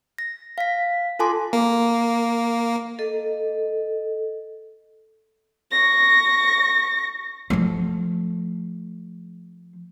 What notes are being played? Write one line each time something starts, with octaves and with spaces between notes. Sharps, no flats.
A#6
F5 B6
F4 A4 G#5 A5 C6 D6
A#3
A4 D#5
C#6 A#6
F3 A3